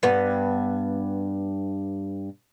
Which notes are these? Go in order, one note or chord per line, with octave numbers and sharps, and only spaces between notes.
G2 B3